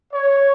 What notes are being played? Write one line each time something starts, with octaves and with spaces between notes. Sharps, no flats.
C#5